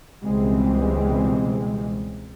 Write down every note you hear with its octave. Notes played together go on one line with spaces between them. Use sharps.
C#2 B2 E3 G3 G#3 C4